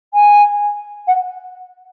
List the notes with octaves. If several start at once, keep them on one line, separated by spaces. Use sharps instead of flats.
G#5
F#5